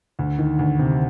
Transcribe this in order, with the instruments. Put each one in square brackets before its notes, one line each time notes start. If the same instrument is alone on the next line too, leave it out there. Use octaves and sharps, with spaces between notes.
[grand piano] D2
D#3
D2
C3